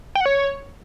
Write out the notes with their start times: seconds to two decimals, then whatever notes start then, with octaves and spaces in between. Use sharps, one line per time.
0.15 G5
0.20 F#5
0.26 C#5